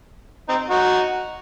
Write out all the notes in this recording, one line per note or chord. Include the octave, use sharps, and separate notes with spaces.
C4 D#4
D#4 F#4